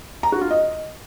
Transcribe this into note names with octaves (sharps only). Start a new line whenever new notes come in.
A#5
F#4
F4
D#5